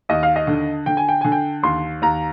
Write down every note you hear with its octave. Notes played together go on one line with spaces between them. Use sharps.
D#2 D#5
F5
D#5
D3
D3 G5
G#5
G5
D3 G#5
G5
D#2 C6
D#2 A#5